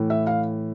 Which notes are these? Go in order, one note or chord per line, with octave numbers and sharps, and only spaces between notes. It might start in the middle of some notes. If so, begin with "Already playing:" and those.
Already playing: A2 E3
E5
F5